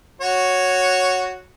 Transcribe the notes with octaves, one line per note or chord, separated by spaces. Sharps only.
F#4 C#5